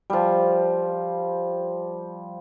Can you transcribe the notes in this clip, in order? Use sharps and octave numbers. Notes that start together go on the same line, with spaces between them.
F3 G3